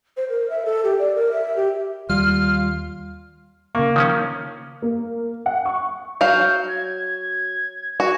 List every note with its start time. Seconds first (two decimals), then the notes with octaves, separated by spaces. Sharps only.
0.17 C5
0.29 A#4
0.50 E5
0.65 A4
0.84 G4
0.99 D5
1.16 A#4
1.32 E5
1.56 G4
2.09 D#2 G3 F4 F6
3.75 C#3 A#3 C#6
3.96 D#3 F3 C#4
4.82 A#3
5.46 F#5
5.66 C#6
6.21 F#3 F5 G6
6.68 G#6
8.00 F#4